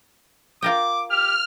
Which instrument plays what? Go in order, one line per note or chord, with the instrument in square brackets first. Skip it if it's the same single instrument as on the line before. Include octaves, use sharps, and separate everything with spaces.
[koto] F4 A#4 G5 [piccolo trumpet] D6
[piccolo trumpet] G4 [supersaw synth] F6